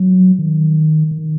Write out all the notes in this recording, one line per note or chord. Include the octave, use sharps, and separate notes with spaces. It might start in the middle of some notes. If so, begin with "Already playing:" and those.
Already playing: F#3
D#3
D#3